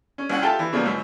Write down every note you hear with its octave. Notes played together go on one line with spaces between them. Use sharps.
C#4
C2 C#4 F#5
F4 G4 A4 E5 G5 A5
E3
C#3 F3 G3 A#3 B3
C#2 F#2